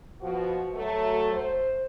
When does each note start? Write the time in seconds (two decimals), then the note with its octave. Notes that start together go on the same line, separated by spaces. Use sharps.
0.21 B2 F3 F#4
0.74 F#3 A3
1.32 C5